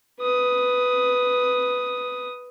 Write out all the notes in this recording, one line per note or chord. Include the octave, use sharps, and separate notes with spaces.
B4 D#6